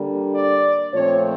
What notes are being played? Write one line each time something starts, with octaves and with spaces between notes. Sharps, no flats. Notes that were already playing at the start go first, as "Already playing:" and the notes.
Already playing: D3 G3 A#3
D5
A#2 F3 A3 C4 C#5